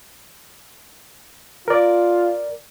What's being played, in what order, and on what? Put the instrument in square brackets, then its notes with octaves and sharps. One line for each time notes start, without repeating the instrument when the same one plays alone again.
[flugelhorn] F4 [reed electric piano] A#4 D5